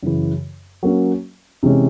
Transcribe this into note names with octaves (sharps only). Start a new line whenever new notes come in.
F#2 C#3 E3
F#3 A#3 C#4
C3 E3 G#3 C#4